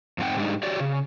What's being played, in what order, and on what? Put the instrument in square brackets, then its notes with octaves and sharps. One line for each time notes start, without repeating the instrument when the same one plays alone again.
[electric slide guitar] F2 G#2 C4 D#4 F#5 G5
G#2 G3 G#3 D4 D#4
F#4 G4 C#5 D5
C#3